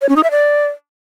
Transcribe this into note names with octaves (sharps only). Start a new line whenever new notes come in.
C#5
C#4
D#4
E5
D5